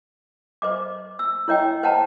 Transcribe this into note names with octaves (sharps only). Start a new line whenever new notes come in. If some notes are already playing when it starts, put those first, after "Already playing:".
C5 D#5 D6
E6
E4 C#5 D#5 G5
C5 D#5 F#5 G5 A5 A#5